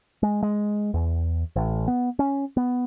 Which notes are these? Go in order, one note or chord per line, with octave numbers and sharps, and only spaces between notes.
G#3
G#3
E2
A1
B3
C#4
B3